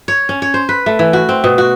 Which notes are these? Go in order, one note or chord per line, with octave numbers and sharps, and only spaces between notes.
C#5
C#4
C#5
C5
B4
A3
E3
F#4
C4
B2
F#4